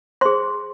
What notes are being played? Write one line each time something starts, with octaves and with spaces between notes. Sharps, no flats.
G#4 C5 C6